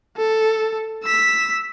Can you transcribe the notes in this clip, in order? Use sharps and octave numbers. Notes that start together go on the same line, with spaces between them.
A4
E6 B6